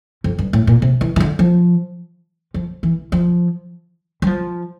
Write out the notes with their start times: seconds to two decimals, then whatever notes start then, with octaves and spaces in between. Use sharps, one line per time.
0.24 F2
0.39 G2
0.53 A2
0.67 A#2
0.82 C3
1.01 E3
1.16 E3
1.20 D3
1.39 F3
2.54 F3
2.83 E3
3.12 F3
4.22 G3
4.27 F3